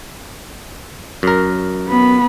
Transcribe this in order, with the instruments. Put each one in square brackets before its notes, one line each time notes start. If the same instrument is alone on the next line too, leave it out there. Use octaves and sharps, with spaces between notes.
[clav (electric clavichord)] F#2 A#4
[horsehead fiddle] B3 B5